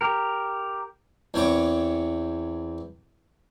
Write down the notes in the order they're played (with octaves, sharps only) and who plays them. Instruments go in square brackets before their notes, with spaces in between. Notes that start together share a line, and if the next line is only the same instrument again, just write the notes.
[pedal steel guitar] G4 A#4
[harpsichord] E2 C4 C#5 C#6 D6